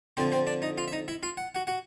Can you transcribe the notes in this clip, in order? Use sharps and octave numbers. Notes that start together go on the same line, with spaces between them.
F2 D3 F3 C4 C5
C4 C5
D4 D5
D#4 D#5
F4 F5
E5
D#4 D#5
E4 E5
F4 F5
F#5
F#4 F#5
F#4 F#5